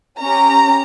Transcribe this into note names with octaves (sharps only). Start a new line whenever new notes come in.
C#4 G4 A#5